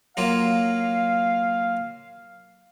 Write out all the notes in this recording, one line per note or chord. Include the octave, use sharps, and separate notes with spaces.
F#3 A#3 F4 F5